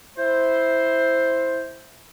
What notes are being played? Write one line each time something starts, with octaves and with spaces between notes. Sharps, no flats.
E4 C5